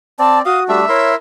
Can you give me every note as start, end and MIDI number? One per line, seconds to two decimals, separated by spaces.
0.19 0.42 60
0.19 0.42 74
0.19 0.39 81
0.45 0.81 66
0.45 0.59 77
0.45 0.64 87
0.68 0.85 55
0.68 0.85 57
0.68 0.85 62
0.68 1.15 76
0.89 1.15 64
0.89 1.15 70
0.89 1.12 73
0.89 1.15 84